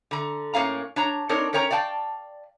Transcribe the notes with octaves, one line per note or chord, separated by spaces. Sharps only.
D3 A#5
A2 A#3 C#4 F5 A#5
D4 C#5 A#5
C4 D4 D#4 A#4 C#5
C#4 A#4 C#5 G5 A#5
D5 F5 G5 A5